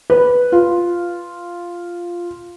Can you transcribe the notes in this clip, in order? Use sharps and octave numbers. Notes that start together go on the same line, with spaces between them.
B4
F4